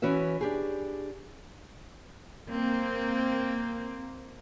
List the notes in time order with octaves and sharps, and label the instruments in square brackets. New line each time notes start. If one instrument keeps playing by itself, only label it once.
[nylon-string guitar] E3 C#4 F#4 B4 E5
D4 G4 G#4
[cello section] A#3 C4